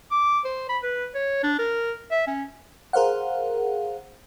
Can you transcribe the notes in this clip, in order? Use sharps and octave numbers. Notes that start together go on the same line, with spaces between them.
D6
C5
B5
B4
C#5
D4
A#4
E5
C#4
G#4 A#4 C5 F5 F#5